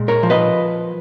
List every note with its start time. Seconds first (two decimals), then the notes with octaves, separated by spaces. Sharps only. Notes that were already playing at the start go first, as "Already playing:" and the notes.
Already playing: A#2 G#3
0.08 A#4 C#5
0.23 F3
0.30 B4 D#5